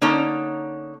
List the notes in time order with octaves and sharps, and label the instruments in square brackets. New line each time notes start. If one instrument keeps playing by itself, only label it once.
[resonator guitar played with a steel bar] D3 A#3 C#4 D#4 C#5 A5